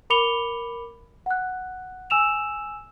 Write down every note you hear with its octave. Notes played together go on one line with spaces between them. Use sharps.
A#4 B5 D6 C#7 F7 G7
F#5 F#6
G#5 E6 E7 F7